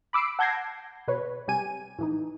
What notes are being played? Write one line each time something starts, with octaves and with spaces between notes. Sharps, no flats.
B5 D6 E6 C7 D7
F#5 A5 G6 G#6 A#6 C7
B2 B4 C#5
C3 G3 G4 G#5 D#7
A2 E3 D#4